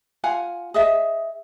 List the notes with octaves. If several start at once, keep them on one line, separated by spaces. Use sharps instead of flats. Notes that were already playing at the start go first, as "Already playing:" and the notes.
F4 F5 F#5 G#5
G#4 D#5 E5